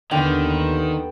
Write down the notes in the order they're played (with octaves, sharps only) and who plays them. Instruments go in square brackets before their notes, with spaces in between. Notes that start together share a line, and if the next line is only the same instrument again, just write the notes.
[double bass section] D#2 B3 [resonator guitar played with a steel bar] D3 [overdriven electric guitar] D#3 [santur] G5